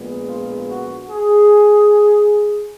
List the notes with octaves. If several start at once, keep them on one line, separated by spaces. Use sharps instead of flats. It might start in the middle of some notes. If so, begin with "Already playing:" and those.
Already playing: A#1 A#2 G#3 B3
F4
F#4
G#4